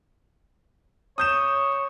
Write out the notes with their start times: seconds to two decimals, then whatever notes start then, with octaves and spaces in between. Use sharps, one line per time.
1.18 C#5 D#6 G6 E7